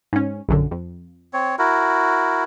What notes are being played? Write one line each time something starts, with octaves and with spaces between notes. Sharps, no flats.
G#2 C#4
A#1 F#2 D3
F2
C4 C#5
E4 F#4 A#4